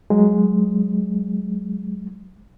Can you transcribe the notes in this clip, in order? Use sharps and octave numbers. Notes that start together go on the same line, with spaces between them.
F#3 G#3